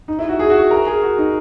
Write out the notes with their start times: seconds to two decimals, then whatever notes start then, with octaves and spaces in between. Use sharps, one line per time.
0.08 D#4
0.19 E4
0.29 F#4
0.39 G#4
0.50 F#4
0.71 A#4
0.87 G#4
1.02 F#4
1.18 D#4